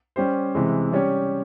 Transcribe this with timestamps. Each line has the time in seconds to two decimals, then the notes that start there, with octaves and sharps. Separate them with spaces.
0.16 G3 C#4 G4 C5
0.55 C3 E3 G#3
0.92 G3 C#4 G4 C#5